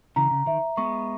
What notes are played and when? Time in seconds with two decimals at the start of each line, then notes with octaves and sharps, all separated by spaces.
0.16 C#3 E3 A#5
0.31 C#3
0.46 D#3 E5
0.77 G#3 B3 C#6